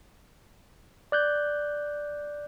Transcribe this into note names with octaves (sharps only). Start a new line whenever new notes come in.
D5 F#6 G6